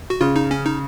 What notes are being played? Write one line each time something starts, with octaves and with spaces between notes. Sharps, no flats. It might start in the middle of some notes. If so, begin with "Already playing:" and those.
F#4
C#3 F4
D#4
C#4
D#4